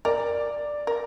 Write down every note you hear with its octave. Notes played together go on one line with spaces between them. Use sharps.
A#4 D5
A#4